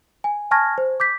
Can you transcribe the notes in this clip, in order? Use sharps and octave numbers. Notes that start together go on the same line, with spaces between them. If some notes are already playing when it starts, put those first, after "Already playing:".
G#5
G#5 A5 C#6 F6 G#6 A#6
C5
D6 G6 B6